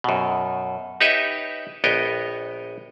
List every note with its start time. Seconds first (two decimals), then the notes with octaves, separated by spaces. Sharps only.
0.04 F#2 B2
1.01 D#4 G4 B4 C#5 D#5 E5
1.84 A#1 B3 C#5 D#5 G5